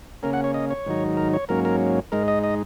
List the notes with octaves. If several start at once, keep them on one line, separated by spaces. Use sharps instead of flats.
C#3 A#3 C#4 A#4
F#5
C#5
D#5
C#5
G#2 D#3 F#3 D#4
A#4
C#5
G#2 F#3 A#3 C#4 A#4
A#4
G#2 G#3 D#4 A#4
D#5
D#5